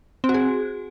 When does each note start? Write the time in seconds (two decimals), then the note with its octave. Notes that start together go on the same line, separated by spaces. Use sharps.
0.24 C4
0.29 F#4
0.34 G#4